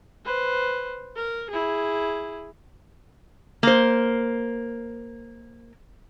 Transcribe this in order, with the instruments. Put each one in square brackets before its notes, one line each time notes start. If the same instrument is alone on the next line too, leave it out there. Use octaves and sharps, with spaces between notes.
[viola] B4 C5
A#4
E4 G#4
[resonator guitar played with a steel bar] A#3 C5